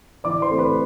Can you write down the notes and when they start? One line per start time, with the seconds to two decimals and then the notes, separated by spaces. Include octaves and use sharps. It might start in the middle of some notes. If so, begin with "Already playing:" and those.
0.24 E3 D5 D6
0.42 C5 C6
0.50 A3 C4
0.58 B4 B5